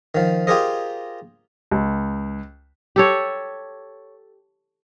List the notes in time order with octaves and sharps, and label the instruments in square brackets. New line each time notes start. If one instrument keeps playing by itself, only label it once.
[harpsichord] D#3 F3
F4 G4 G#4 A#4 C5 D#5
[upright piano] C#2
[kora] G4 A4 C#5